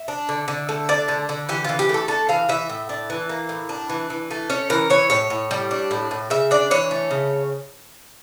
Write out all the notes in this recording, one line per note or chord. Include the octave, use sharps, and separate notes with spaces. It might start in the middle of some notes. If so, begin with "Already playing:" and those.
Already playing: E5
D4
D3
D3
A3
D4 D5
D3
D3
E3 G4
E3 F4
G4
A3 A4
D4 A4
E3 F5
E3 E5
A2
D4
E3
A#3
A2
D4
E3
E3
A3
C#4 C#5
E3 A#4
E3 C#5
A2 C#5
A2
G3
D4
A2
A2
C#3 E5
D4 D5
E3 C#5
A3
C#3